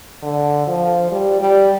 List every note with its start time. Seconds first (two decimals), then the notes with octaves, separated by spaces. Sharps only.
0.23 D3
0.67 F3
1.11 G3
1.41 G3